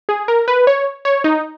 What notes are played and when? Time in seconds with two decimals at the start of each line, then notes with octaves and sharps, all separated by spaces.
0.09 G#4
0.28 A#4
0.48 B4
0.67 C#5
1.05 C#5
1.24 D#4